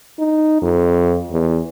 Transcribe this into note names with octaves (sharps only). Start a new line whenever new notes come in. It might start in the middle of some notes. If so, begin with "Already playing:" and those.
D#4
F2
E2